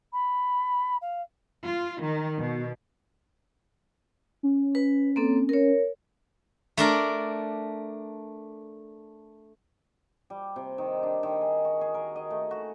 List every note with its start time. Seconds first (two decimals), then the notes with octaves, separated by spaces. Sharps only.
0.12 B5
1.01 F5
1.64 F4
2.01 D#3
2.39 B2
4.43 C#4
4.75 B4
5.16 A#3 C4 A4
5.49 A#4 C#5
6.77 A3 D4 A#4 D5
10.30 G3
10.56 C3
10.78 D#3
11.03 D4
11.23 D#3
11.41 G#4
11.65 F#4
11.81 G#4
11.94 A#4
12.16 D#5
12.30 A3
12.51 F#4